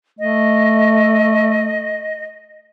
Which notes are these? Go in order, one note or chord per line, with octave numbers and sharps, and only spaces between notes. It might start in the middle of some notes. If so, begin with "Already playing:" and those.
A3 D#5